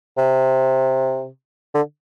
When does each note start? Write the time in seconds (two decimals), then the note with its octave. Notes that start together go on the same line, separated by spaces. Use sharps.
0.18 C3
1.74 D3